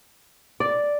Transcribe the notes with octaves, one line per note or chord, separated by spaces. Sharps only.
D5